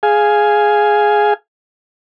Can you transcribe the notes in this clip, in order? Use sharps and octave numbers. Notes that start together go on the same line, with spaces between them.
G#4 F5 G#5